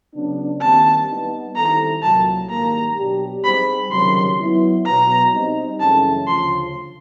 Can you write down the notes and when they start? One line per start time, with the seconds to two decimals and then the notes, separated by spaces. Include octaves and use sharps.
0.14 C#3 F#3 B3 D4
0.61 D#2 D#3 G3 C4 A5
1.08 G3 B3 D#4
1.55 D#3 G3 C4 E4 A4 A#5
2.02 C2 A#2 F#3 A5
2.49 G#2 D#3 G3 A#3 A#5
2.96 B2 F#3 B3 D4 G4
3.44 G3 C4 D#4 G#4 C5 B5
3.91 C#2 C3 D#3 F#3 C6
4.38 F#3 B3 E4
4.85 B2 F#3 B3 A#5
5.32 G3 C4 D#4
5.80 F#2 C#3 E3 A3 C#4 A5
6.27 D2 C#3 F3 C6